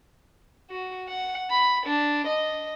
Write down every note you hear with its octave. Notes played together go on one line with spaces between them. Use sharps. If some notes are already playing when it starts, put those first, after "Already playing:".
F#4
F#5
B5
D4
D#5